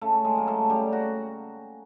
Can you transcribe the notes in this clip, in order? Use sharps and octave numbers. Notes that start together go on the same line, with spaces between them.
C#3 A3 A4
G#3 G#4
F#3 A#3
A3 A4
C#3 G3 G4
F#4